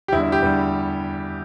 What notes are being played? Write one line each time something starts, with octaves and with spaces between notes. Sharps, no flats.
G4
E2 D3 G3 E4
E4
G4
E2 D3 G3